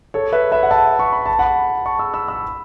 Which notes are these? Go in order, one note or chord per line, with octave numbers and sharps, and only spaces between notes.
A4 C#5
B4 E5
B4 E5
F#5
E5 A5
C#6
B5
A5
F#5 B5
A5 C#6
B5 E6
B5 E6
B5 E6